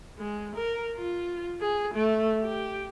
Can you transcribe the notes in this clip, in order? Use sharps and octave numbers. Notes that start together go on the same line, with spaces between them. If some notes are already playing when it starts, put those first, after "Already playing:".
G#3
A#4
F4
G#4
A3
G4